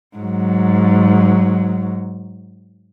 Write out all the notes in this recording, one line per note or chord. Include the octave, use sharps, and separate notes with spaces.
G#2 F#3